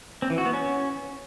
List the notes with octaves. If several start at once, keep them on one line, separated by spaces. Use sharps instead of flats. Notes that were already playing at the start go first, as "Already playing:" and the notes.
C4
E3
F#4
B3
C#4